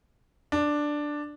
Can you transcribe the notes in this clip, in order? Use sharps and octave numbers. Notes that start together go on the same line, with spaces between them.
D4